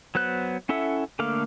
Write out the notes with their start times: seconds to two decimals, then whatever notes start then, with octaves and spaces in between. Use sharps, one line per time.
0.15 F#3 B3 C5 F#6
0.69 C#4 E4 A4 E5 F#5
1.19 D3 A3 A#3 F5 D6